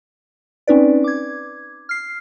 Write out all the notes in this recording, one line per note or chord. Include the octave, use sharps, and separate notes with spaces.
C4 C#4 D#4 B4 D5
D6 G#6
F6 C7